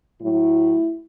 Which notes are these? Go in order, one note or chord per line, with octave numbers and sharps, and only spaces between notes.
A2 F#3 E4